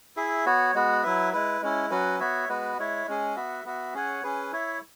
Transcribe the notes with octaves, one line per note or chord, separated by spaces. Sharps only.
E4 G#4 E5
B3 F#4 C#5
G#3 B3 F#4
F#3 E4 B4 E5
G#3 E4 B4
G#3 C#4 E4
F#3 C#4 F#4 B4
B3 F#4 C#5 E5
G#3 B3 F#4 B4
G#3 E4 C#5 E5
G#3 C#4 G#4
B3 F#4 E5
B3 F#4 E5
C#4 G#4 C#5 F#5
C#4 G#4 B4
E4 C#5 E5